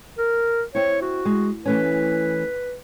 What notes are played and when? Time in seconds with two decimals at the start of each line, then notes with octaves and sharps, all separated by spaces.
0.18 A#4
0.75 C4 E4 C#5
1.01 F#4
1.25 G#3
1.66 E3 A3 C#4 B4